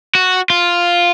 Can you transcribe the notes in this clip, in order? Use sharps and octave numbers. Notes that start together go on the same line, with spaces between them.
F#4
F4